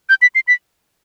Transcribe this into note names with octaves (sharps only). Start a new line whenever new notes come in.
G6
B6
C7
B6